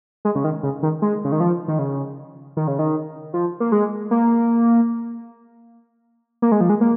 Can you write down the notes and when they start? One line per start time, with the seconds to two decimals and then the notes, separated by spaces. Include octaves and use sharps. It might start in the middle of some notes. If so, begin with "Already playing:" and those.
0.25 G#3
0.35 C#3
0.44 D#3
0.63 C#3
0.83 D#3
1.02 G#3
1.25 C#3
1.32 D#3
1.40 F3
1.68 D#3
1.79 C#3
2.57 D#3
2.68 C#3
2.79 D#3
3.34 F3
3.60 A#3
3.72 G#3
4.11 A#3
6.42 A#3
6.52 G#3
6.61 F3
6.70 G#3
6.81 A#3